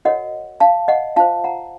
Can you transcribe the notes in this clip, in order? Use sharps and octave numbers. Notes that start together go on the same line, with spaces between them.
F#4 A#4 C#5 D#5 F#5
F5 A5
D#5 F#5
F4 C5 F5 A5
F#5 A#5